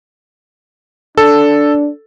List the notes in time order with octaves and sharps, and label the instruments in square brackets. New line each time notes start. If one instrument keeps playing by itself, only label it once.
[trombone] D4 [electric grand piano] A4